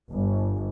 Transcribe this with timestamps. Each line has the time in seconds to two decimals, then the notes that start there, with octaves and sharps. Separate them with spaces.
0.12 G1